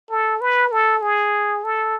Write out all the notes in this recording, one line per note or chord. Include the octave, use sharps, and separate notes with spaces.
A4
B4
A4
G#4
A4